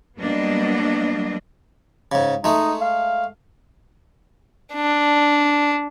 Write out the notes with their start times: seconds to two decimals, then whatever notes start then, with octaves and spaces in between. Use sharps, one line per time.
0.19 F#3 G3 A#3 B3 D4 D#5
2.12 G#2 C#3
2.44 G#3 A3 D#4
2.81 F5
4.74 D4